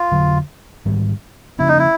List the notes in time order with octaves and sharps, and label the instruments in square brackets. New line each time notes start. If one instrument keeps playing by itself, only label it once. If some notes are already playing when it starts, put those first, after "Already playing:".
Already playing: [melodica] F4
[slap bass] F2 D3 F#3
G#2 D#3 G3
[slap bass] C#3 F3 A#3 C#4 [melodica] E4
[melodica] D#4
E4